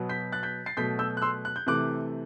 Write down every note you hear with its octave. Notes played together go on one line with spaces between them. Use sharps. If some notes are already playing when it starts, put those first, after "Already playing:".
Already playing: B2 F#3 B3
G6 B6
F#6 A6
G6 B6
A6 C7
B2 F#3 A3 G6 B6
E6 G6
F#6
C6 E6
F#6
G6
C3 E3 A3 D6 F#6